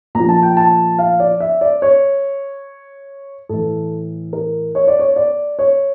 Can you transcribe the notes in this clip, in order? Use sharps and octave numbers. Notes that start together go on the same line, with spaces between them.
A#2 F3 A#5
A5
G5
A5
F5
D5
E5
D5
C#5
A2 E3 A4
A#4
C#5
D5
C#5
D5
C#5